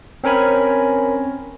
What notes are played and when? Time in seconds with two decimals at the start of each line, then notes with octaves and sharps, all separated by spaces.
0.24 C4 C#4 A#4 G#5 B5